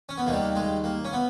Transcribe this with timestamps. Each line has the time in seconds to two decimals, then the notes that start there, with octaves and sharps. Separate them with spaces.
0.09 C#4
0.18 B3
0.27 D#2 D#3 G3 A#3
0.55 G#3
0.84 A#3
1.05 C#4
1.13 B3